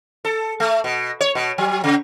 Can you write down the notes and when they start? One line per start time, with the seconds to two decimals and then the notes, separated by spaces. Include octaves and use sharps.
0.25 A4
0.60 A3
0.84 B2
1.21 C#5
1.35 B2
1.58 F#3
1.84 C#3